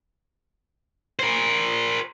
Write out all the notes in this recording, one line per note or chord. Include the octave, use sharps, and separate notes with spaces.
A#4 C5